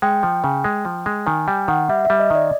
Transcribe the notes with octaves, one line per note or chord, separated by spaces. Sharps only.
G#3 G5
F3
C#3
G#3
F3
G#3
D#3 G#5
G3 G5
D#3 F#5
G3 E5
E5
G3
D#5
D#3 D5